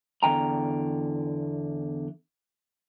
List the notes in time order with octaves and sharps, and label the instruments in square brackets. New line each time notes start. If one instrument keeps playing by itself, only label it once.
[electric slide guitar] E2 D3 G5 A#5